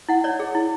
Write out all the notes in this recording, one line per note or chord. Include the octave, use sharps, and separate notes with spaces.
E4 F#5
C#5 D5
G#4
E4